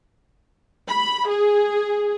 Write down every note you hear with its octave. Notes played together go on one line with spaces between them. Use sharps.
B5
G#4